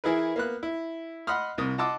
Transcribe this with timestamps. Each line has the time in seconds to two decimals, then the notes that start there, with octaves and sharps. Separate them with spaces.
0.04 E3 E4 G#4 A#4 B4
0.36 A#3 B3 F#6
0.63 E4
1.27 D#5 F#5 B5 C6 D#6 F6
1.58 C2 C3 A#4 D#6
1.78 D#5 F#5 A5 C6 D6 E6